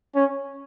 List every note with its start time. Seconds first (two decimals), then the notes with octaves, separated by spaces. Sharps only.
0.15 C#4